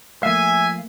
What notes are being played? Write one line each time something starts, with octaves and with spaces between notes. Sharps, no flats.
F3 A3 A#3 E5 F5 G#5